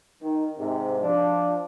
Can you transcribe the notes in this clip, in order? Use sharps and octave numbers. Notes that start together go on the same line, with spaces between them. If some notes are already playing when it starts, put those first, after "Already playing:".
D#3
G#2 C3
F3 D4